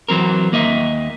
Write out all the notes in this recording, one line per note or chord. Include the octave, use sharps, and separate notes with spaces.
E3 F#3 C4 A#4
D#2 A#3 D#5 E5